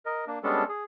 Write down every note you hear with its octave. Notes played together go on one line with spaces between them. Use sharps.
A#4 D#5
A#3 D4
G3 G#3 B3 C#4 D4 A4
G#4